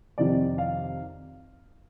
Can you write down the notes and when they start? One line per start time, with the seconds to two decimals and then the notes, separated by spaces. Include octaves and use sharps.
0.18 F2 C3 D#3 D5
0.58 F5